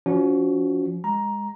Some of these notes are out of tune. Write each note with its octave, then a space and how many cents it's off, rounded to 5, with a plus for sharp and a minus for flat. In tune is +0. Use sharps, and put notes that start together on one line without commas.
F3 -5 C#4 +35 F#4 +0
G#3 -20 A#5 +10